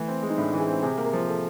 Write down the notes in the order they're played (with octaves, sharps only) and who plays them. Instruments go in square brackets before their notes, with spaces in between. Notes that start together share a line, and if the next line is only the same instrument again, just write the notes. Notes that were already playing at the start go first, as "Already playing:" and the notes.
Already playing: [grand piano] E3 [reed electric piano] A3
[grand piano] C4
G#3
[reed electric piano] D#4
[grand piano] A2 [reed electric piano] D4
[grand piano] E3
[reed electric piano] G#4
[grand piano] C4
[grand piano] C3 [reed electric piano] G#4
[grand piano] A#3
[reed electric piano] A#4
[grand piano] F3
[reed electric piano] A4